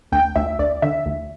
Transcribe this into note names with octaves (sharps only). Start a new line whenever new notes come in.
D2 G5
D2 E5
D2 D5
D3 E5
D2